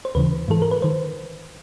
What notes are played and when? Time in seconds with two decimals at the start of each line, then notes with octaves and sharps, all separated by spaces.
0.05 C5
0.15 D#2 C#3 E3 B4
0.48 G#2 E3 A4
0.62 A#4
0.71 B4
0.82 D#3 C5